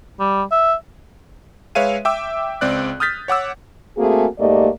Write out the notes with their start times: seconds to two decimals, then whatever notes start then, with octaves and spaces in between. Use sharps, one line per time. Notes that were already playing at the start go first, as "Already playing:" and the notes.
0.20 G3
0.52 E5
1.75 G#3 B4 C#5 E5 F5 D#7
2.05 E5 G5 D6 E6
2.61 C#2 C4 D5 F#6
3.00 D#6 F6 G6 A6 B6
3.28 C#5 F#5 D6 E6
3.98 A3 A#3 C4 F#4 G#4
4.39 G#2 A3 A#3 G4 D5 D#5